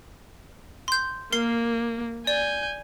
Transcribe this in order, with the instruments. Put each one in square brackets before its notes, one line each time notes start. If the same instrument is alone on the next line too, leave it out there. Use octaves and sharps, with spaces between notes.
[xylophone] C6 G6
[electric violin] A#3 [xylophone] A#4 C7
[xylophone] D5 [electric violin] G#5 G6